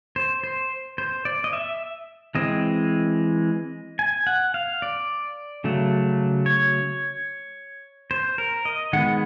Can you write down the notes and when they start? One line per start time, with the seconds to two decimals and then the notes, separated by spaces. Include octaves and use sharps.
0.16 C5
0.44 C5
0.98 C5
1.25 D5
1.44 D#5
1.53 E5
2.35 E3 G#3 C4 D#5
3.99 G#5
4.27 F#5
4.54 F5
4.82 D5
5.64 C#3 F#3 A3
6.46 C#5
8.11 C5
8.38 A#4
8.65 D#5
8.93 D#3 G#3 B3 F#5